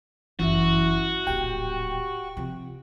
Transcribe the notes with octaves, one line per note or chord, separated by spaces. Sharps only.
G1 F#2 E3 C#4 E4 F#4 E5
D1 A#1 G4 G5
C3 F3